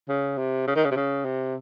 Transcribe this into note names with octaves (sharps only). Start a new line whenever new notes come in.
C#3
C3
C#3
D#3
C#3
C3
C#3
C3